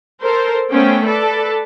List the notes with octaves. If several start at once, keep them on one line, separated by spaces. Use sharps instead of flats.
A4 A#4 C5
A3 B3 C#4 C5 G5
A4 B4 D5 A5